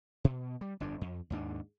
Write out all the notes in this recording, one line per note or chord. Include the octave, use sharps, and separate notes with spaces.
B2
G3
G1 F2 D4
F2
D#2 G#2 D4